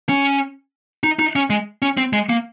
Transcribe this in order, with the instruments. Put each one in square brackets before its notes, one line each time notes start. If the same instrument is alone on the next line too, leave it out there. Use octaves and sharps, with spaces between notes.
[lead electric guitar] C#4
D#4
D#4
C#4
G#3
C#4
C4
G#3
A#3